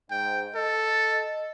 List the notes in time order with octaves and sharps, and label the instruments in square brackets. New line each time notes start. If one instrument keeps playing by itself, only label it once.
[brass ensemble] G#2 [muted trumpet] G5
[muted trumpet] A4 [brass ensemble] D#5